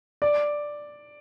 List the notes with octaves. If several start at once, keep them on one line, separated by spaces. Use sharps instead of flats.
D5